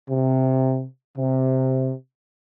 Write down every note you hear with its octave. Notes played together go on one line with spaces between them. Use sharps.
C3
C3